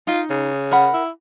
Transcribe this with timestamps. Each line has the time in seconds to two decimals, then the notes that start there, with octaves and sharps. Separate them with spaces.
0.07 D#4 F4
0.30 C#3
0.71 A#4 F#5 B5
0.94 E4